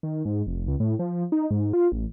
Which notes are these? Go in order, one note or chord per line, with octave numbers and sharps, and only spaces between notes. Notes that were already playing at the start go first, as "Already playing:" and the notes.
D#3
G#2
F1
C#2
A2
F3
D#4
G#2
F4
A1